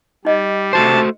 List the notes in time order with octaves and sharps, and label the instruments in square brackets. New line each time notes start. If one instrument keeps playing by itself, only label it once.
[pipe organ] G3 [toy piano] D#4 D#5
[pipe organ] C3 [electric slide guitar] A3 F#4 C5 [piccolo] A5